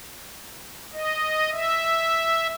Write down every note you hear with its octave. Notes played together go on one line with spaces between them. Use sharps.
D#5
E5